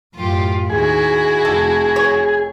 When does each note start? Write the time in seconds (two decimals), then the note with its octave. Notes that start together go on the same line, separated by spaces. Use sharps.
0.15 F#2 A2 F4 G4
0.70 D#2 E4 F#4 G#4
1.45 F1 A4
1.96 C#5